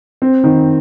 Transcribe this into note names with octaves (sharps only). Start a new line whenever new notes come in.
C4
D#3